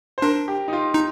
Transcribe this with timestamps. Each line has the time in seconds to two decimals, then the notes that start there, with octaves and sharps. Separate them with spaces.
0.18 C5
0.22 D4 A#4
0.48 G4
0.68 D#4
0.73 F4
0.94 D#4